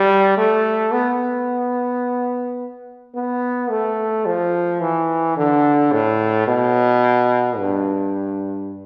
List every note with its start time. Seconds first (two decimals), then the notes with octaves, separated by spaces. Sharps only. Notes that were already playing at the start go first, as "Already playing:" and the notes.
Already playing: G3
0.38 A3
0.93 B3
3.15 B3
3.70 A3
4.26 F3
4.81 E3
5.37 D3
5.92 A2
6.47 B2
7.58 G2